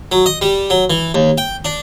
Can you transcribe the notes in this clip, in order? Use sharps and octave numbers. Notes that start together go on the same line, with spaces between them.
F#3
D#5
G3
F#3
E3
D#2
G5
D4